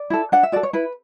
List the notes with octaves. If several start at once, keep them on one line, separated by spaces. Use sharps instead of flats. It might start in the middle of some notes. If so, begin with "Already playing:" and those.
Already playing: D5
E4 A4
D4 F#5
E5
F#4 A4 D5
C#5
E4 B4